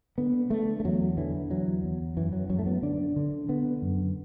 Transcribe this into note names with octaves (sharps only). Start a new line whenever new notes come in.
D3 B3
D3 A3
A3
E2 F#3
D3 E3
E2 F#3
E2
F#2 E3
F#3
F#2 F#3
A3
B3
D3 D4
D3
D3 B3
F#2